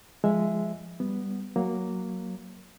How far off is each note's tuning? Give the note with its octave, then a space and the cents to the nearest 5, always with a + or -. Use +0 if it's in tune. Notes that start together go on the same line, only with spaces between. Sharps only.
F3 -5 G#3 +0 E5 +0
G3 +0 B3 +0
F#3 +0 A#3 +0